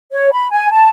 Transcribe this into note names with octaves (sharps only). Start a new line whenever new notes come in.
C#5
B5
G#5
A5